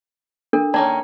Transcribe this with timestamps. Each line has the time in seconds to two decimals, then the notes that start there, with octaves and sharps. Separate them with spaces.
0.53 D4 A4 A#4
0.74 D#3 A#3 C#4 D5 A5